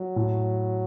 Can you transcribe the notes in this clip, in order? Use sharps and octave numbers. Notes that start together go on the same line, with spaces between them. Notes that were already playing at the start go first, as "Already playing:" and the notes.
Already playing: F#3
A2